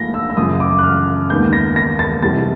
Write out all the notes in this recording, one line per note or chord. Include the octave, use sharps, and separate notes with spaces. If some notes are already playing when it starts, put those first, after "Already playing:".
Already playing: G#2 F3 A#3 G6 A#6
E6
E6
F#2 C#3 F3 D#6
D6
F#6
F6
D#2 D#3 G#3 B3 G6
A#6
A#6
A6
F2 C3 E3 G3 A6